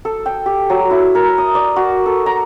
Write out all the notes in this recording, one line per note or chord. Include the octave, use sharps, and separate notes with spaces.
A4
G5
G4
F#3
E4
A#4
D#6
D5
F#4
A4
A#5